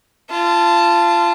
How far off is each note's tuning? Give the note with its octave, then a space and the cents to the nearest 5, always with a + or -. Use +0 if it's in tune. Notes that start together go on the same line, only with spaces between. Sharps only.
F4 -25 A5 +0